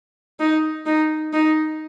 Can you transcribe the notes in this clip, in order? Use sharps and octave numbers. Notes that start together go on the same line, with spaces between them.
D#4
D#4
D#4